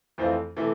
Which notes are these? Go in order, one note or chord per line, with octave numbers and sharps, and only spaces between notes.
F2 E3 A3 C4 F4
C3 E3 A3